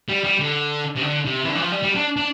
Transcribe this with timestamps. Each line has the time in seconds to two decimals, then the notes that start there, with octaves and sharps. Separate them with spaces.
0.09 G3
0.24 G3
0.39 D3
0.96 C3
1.02 D3
1.25 C3
1.44 E3
1.49 D3
1.55 E3
1.60 F3
1.72 G3
1.83 G3
1.95 D4
2.17 D4